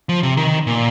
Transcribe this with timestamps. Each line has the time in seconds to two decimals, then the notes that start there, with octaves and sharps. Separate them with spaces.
0.09 F3
0.23 C3
0.37 D#3
0.67 A#2